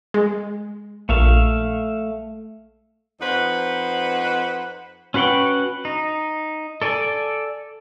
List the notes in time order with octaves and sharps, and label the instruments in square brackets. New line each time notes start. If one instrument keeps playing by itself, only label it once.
[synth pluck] G#3
[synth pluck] A#1 [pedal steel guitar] A3 E5 F5
[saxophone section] F2 D#4 B4 C5 F#5
[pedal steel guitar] C#4 F#4 B4 F#5 G5
D#4
A4 D5 G#5